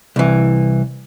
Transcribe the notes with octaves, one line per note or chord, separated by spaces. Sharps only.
C2 E3